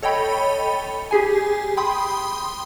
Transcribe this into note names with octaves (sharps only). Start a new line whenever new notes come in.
A4 C#5 D#5 G5 B5
G4 G#4 G#5
G5 B5 C6 D#6